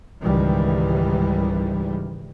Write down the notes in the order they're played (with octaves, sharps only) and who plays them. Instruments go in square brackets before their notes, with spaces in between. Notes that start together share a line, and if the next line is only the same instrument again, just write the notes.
[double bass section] C#2 G#2 D#3 E3 G3